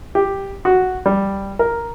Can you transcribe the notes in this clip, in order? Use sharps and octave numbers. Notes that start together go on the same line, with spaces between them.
G4
F#4
G3
A#4